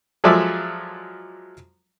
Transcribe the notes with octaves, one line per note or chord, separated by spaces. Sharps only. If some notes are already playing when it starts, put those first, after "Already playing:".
F3 F#3 G#3 A4 D5 E5